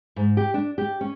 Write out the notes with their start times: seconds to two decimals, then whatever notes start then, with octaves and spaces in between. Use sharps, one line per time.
0.16 G#2
0.37 G4
0.54 D4
0.78 G4
1.01 C#4